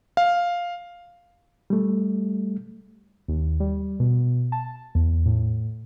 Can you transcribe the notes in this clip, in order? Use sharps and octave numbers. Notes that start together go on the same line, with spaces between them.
F5
G3 A3
D#2
G3
B2
A5
E2
A2